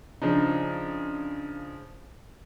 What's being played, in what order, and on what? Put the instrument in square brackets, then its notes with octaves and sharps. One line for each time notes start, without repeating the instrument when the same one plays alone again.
[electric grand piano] C#3 F3 D4 D#4